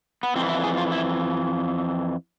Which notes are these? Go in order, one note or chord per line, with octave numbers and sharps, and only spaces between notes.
B3
F2 E3 C4
E4
G#4
F4
E4